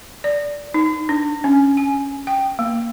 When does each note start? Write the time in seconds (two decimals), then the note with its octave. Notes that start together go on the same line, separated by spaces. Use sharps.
0.24 D5
0.74 D#4
1.09 D4
1.44 C#4
1.77 G#5
2.27 G5
2.59 A#3